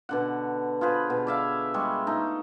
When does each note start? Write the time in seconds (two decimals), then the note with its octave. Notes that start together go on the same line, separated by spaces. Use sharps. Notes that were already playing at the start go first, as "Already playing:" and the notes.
0.09 B2 D3 F#5
0.81 F4 G#4 B4 C5
1.10 B2
1.27 D5 E5 F5
1.74 G3 G#3 C#6
2.07 A3 D#4